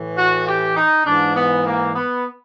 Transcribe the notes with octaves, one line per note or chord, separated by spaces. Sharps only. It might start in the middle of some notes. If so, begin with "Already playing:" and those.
Already playing: A2 E3
F#4
G4
D#4
G#2 E3 D4
B3
A#3
B3